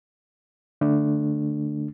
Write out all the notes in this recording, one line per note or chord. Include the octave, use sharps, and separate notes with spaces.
D3 A3 D4